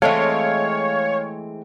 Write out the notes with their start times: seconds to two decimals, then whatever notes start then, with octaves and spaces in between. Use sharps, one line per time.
0.02 E3 G#3 A3 C4 C#5 F5